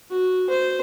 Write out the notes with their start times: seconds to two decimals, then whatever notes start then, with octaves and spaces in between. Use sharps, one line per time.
0.11 F#4
0.50 C5